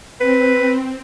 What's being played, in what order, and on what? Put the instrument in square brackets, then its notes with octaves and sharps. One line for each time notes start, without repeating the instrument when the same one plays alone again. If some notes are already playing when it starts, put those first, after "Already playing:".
[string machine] C4 [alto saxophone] B4